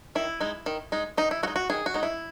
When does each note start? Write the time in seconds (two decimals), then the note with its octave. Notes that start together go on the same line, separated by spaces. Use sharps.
0.15 D#3 E4
0.40 G#3 D#4
0.66 D#3
0.92 G#3 D#4
1.17 D#3 D#4
1.31 E4
1.43 G#3 F#4
1.48 D#4
1.56 F#4
1.70 D#3 G#4
1.86 F#4
1.94 G#3 D#4
2.03 E4